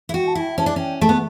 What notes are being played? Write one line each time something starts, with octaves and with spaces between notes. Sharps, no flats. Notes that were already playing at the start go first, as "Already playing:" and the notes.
E4
F#4 G5
A5
E4
G5
G5
C#4 A5
D4
C#4 G5
A3 A5
B3